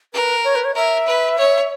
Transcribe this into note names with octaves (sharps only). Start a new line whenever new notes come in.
A#4 B4
C#5
B4
C#5
A#4 E5
B4
C#5